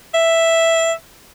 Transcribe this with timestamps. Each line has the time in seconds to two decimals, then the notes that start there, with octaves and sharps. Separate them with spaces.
0.15 E5